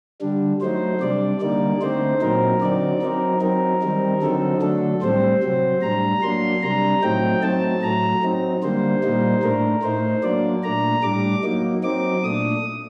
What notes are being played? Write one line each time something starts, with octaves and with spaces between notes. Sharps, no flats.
D3 G3 D4
F#3 A3 D#4 C5
C3 G3 D4 D5
D3 G3 A#3 D#4 D5
D3 A3 C4 D#4 C5
A#2 F#3 C4 D#4 A#4
D3 F#3 C4 D#4 D5
F#3 C4 D#4 A#4
F#3 C4 D#4 A#4
D#3 G3 C4 D#4
D3 F#3 C4 D#4 A4
D3 F#3 A3 D4 A4
A2 G3 C4 C5
C3 F#3 C4
A2 G3 D4 A#5
F#3 A#3 D4 C6
C3 G3 D4 A#5
A2 F#3 A3 C4 D#4 G5
F#3 A3 C4 D#4 A5
A2 F#3 A3 A#5
F#3 C4 D#4
D3 G3 A#3 C5
A#2 G3 A#3 D#4
A2 A3 D4 A#4
A2 A3 D#4 C5
F#3 A#3 D4 D5
A#2 A3 D4 A#5
A2 G3 D4 D6
F#3 A#3 D#4
F#3 C4 D#4 D6
A#2 A3 D4 D#6